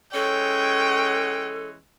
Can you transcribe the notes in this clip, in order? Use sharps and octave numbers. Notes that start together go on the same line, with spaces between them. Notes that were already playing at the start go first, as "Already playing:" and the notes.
E3 G#3 C#4 A4 C#5 G5